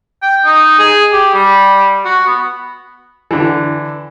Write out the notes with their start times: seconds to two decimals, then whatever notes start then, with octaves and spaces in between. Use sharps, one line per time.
0.22 G5
0.45 D#4
0.79 G#4
1.12 G4
1.34 G3
2.05 F#4
2.27 B3
3.31 D3 E3